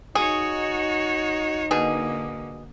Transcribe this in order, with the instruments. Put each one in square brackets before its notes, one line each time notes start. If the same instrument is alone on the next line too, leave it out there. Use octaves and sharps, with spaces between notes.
[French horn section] D#4 [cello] F#4 C#5 [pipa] G#4
[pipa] B2 G#4 [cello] D3 A#3